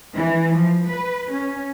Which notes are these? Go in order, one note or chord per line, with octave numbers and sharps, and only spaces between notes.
E3
F3
B4
C#4